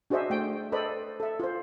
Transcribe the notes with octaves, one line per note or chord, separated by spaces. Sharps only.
D4 F#4 G#4 C5 D#5 E5
A3 G5
A4 B4 C5 D5 D#5 B5
A4 E5
F4 C5